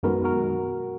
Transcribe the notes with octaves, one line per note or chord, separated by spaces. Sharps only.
F#2 D#3 G#3 B3 F#4 A#4
F#4 A#4